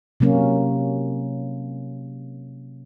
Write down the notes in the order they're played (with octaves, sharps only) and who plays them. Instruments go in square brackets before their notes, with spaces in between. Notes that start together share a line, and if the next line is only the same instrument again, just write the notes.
[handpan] C3 F#3 A#3 C#4